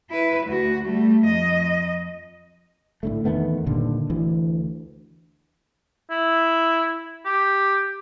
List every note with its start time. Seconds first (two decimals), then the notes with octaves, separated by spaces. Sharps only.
0.11 E4 B4
0.46 D2 F#4
0.84 G3 A3
1.25 F2 D#5
3.03 A2 D3 A3
3.25 E2 D#3 A3 B3
3.66 G2 A#2 D3 D#3
4.10 D2 E3
6.11 E4
7.25 G4